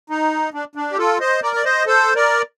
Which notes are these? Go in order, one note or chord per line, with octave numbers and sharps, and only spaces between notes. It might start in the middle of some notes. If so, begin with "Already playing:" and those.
D#4
D4
D4
G4
F4 A4
C5 D#5
A#4 D5
D5
C5 D#5
A4 C5
A#4 D5